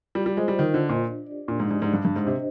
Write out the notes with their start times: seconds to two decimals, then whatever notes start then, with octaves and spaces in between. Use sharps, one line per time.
0.15 G3 F4
0.26 G3
0.37 G#3 C5 D#5
0.48 G3
0.59 D#3 F4
0.74 D3
0.82 C5 D#5
0.89 A#2
1.04 D4
1.26 G4 D5
1.48 A#2 D4
1.60 G#2
1.71 G#2 G4 D5
1.82 G#2
1.93 G2 D4
2.05 G2
2.16 G#2 G4 C5 D#5
2.27 C3